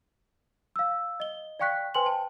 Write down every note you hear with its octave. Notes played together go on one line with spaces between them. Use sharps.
F5 E6
D#5 G7
D5 F5 G5 C#6 F#6 B6
B4 C5 G5 G#5 C6 F#7
C5 G5 A5